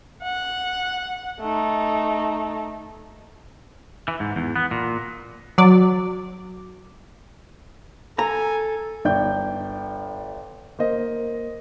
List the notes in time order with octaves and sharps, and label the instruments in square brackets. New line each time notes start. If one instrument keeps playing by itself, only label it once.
[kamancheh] F#5
A3 D#4
[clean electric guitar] E3
G#2
E2
B3
A#2
[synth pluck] F#3 D5
[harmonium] A4 [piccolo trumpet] G#5 [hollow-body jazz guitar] A#5
[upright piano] G1 D5 G5 G6
A#3 C5 D#5